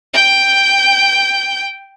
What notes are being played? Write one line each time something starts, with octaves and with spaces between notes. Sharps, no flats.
G5 G6